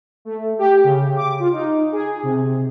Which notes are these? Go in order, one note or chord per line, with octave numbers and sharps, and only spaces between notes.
A3
G4
C#3
D6
F4
D#4
G#4
C3